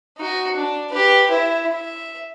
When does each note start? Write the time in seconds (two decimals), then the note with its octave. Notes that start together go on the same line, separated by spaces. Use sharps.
0.18 D#4 F#4
0.56 D4
0.89 G4 B4
1.31 E4 E5
1.72 E5